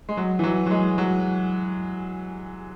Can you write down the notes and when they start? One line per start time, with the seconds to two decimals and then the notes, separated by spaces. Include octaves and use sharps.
0.09 G#3
0.17 F#3
0.39 E3
0.43 F#3
0.66 F#3
0.71 G#3
0.98 F#3